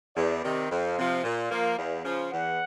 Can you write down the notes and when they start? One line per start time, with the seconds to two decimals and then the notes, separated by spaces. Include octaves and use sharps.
0.16 E2 D5
0.44 C3 D#3
0.71 F2 F5
0.98 C3 F3
1.24 A#2
1.51 F3 A#3
1.78 E2
2.04 C#3 F3
2.32 E2 F#5